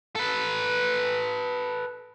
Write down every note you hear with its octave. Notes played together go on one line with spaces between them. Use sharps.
A4 B4